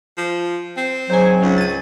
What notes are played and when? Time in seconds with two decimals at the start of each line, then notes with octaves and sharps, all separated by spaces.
0.18 F3
0.77 C4
1.10 G#2 F#3 C5 G#5
1.42 C#2 C#4
1.58 A6 D#7